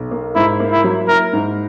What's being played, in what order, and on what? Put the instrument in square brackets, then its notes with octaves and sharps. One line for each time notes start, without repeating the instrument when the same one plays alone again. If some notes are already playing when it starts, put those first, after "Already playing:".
Already playing: [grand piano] B1
A#3
[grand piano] G#2 [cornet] E4
[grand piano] A#3
[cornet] E4
[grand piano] F#3
[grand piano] E4 [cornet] A#4
[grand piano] G#2